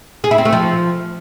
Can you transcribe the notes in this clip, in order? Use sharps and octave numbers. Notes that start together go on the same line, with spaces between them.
G#4
E4
C4
A3
F3